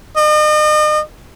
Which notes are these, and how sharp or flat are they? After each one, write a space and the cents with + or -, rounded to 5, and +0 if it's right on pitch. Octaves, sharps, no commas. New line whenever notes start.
D#5 -40